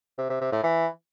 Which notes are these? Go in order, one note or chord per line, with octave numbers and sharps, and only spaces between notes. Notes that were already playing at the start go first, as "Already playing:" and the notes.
C3
C3
C3
A2
E3